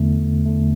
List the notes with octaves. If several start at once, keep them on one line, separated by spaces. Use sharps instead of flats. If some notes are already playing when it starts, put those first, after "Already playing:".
Already playing: E2 D3 A3
E2 D3 A3